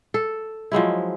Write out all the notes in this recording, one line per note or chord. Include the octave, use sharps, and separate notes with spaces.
A4
F3 F#3 G#3 E4